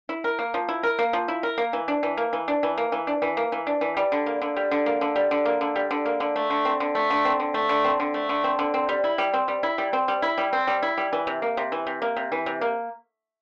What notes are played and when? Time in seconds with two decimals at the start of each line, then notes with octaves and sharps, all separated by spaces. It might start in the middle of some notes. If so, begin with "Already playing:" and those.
0.09 E4
0.24 A#4
0.39 A#3
0.54 F3
0.69 E4
0.83 A#4
0.99 A#3
1.13 F3
1.28 E4
1.43 A#4
1.58 A#3
1.73 E3
1.88 D4
2.03 E3
2.17 A#3
2.33 E3
2.48 D4
2.63 E3
2.78 A#3
2.92 E3
3.07 D4
3.22 E3
3.37 A#3
3.52 E3
3.67 D4
3.81 E3
3.97 G3
4.12 D3
4.26 A#3
4.42 D3
4.56 G3
4.71 D3
4.86 A#3
5.01 D3
5.16 G3
5.31 D3
5.45 A#3
5.61 D3
5.76 G3
5.91 D3
6.06 A#3
6.20 D3
6.36 A3
6.50 D3
6.65 C4
6.80 D3
6.95 A3
7.10 D3
7.25 C4
7.40 D3
7.54 A3
7.69 D3
7.84 C4
8.00 D3
8.14 A3
8.29 D3
8.44 C4
8.59 D3
8.74 C4
8.89 G3
9.04 E4
9.18 G3
9.34 C4
9.48 G3
9.63 E4
9.78 G3
9.93 C4
10.08 G3
10.22 E4
10.38 G3
10.53 C4
10.67 G3
10.83 E4
10.97 G3
11.13 E3
11.27 C3
11.42 A#3
11.57 C3
11.72 E3
11.87 C3
12.02 A#3
12.17 C3
12.32 E3
12.46 C3
12.61 A#3